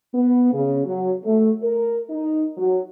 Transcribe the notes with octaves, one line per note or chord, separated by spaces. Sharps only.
B3
C#3
F#3
A3
A#4
D#4
F#3